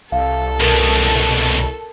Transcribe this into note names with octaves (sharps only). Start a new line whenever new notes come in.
C2 A4 F5
C#2 B2 A#4